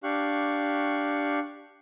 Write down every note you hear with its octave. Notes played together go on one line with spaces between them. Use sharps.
D4 G4 F5 C#6 F#6